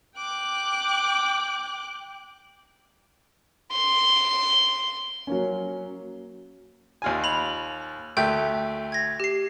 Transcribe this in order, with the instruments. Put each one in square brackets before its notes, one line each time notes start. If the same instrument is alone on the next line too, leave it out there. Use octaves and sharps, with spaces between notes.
[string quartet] G5 D6 F#6
[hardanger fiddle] C6
[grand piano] F#3 A#3 C#4
[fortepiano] D#2 F4 G#5
[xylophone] B5 F7
[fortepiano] D2 A3 [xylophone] G5 G6
[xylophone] G#6 A#6
G4 C7